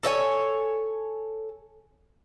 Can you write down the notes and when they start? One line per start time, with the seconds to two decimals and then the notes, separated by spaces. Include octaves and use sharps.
0.03 A4 C#5 E5 G#5